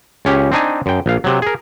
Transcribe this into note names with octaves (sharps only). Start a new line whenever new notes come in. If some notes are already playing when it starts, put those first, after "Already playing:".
C#2 C#4 G4
C4 D4 D#4 G#5
F#2 G5
A#1 F5
C3 F#3
G#4 A#4